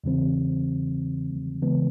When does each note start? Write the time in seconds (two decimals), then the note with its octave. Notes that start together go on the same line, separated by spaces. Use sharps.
0.04 E2 C#3 E3 G3 C4
1.62 C#3 E3 G#3 B3